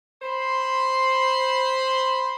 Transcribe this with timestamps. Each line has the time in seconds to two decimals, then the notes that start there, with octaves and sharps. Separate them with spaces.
0.22 C5 B5 C6